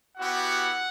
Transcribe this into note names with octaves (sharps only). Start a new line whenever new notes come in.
B3 E4 F#4 G4 F#5